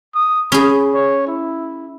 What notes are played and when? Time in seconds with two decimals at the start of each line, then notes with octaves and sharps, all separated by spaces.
0.15 D#6
0.52 C#4 G#4 B5
0.94 C#5
1.27 E4